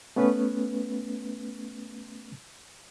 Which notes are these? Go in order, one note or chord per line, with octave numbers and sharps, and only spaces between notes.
A3 B3 C#4 B4